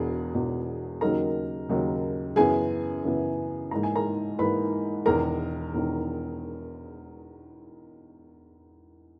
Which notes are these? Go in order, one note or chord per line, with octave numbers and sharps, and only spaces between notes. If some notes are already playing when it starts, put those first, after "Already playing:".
Already playing: E1 E2 B2 G#4
E1 E2 B2
D#2 C#3 F#3 A#3 D#4 A#4 A#5
D#2 C#3 F#3 A#3 D#4
F#2 C#3 E3 B3 G#4 G#5
F#2 C#3 E3 B3
G#2 E3 A#3 A#5
G#5
A#4 A#5
G#2 E3 A#3 B4 B5
E1 E2 D#3 A#4 A#5
E1 E2 D#3